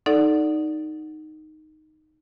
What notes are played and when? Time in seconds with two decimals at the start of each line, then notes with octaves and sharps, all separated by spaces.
0.06 D#4 A4 D5 F#5